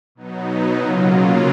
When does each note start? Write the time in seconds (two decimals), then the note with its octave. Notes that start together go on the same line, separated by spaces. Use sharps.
0.15 B2 F#3 B3 D#4
0.76 C#3 F#3 A#3 F4